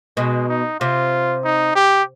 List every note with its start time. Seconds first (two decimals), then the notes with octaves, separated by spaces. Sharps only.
0.17 B2 G#3
0.49 D#4
0.80 C3 F4
1.44 D#4
1.75 G4